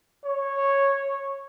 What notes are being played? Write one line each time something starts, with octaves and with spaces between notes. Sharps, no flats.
C#5